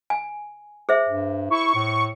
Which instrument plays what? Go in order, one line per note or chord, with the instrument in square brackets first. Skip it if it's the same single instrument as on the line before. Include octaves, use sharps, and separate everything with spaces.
[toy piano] G#5
G#4 C5 E5
[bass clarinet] G2
[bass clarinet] E4 [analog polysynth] C#6
[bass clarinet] A2